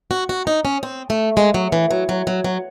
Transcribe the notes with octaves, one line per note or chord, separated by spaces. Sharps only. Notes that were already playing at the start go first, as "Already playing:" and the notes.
F#4
F#4
D#4
C#4
C4
A3
G#3
F#3
E3
F#3
F#3
F#3
F#3